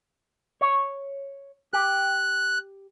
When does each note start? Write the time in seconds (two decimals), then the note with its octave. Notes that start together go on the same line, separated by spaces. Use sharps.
0.61 C#5
1.73 G4 F#6